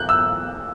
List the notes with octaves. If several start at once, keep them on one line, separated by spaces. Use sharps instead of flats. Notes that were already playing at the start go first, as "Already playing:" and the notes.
Already playing: F#6 G6
E6